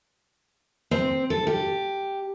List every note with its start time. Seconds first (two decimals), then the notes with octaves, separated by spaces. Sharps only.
0.91 C4
1.30 A4
1.47 G4